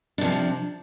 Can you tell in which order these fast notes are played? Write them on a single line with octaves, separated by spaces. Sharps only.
D4 C3 F3